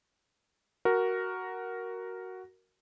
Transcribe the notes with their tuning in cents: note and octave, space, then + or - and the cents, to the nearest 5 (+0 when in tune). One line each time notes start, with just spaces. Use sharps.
F#4 +5 A#4 +0